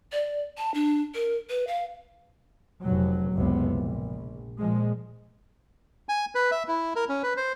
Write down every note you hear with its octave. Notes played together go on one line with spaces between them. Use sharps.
D5
A5
D4
A#4
B4
F5
F1 F#3
F#1 C#2 C3 B3
A#1
A#2 F3 G#3
G#5
B4
E5
E4
A#4
C#4
B4
C5